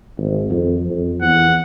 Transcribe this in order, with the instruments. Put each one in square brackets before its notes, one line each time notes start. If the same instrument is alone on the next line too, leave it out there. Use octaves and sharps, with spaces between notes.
[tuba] G#1
F2
F2
[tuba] E2 [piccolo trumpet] F#5